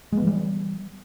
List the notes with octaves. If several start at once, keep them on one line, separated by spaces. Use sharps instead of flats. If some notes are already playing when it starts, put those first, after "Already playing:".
E3 G3 G#3 B3